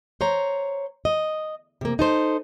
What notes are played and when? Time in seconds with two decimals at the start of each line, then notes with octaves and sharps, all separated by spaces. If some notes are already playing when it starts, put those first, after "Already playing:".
0.21 C5 C#5 A#5
1.05 D#5
1.81 C3 A#3
1.99 D#4 A4 C5